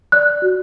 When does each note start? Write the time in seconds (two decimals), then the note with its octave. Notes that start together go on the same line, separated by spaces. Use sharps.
0.12 D5 F#6
0.42 F#4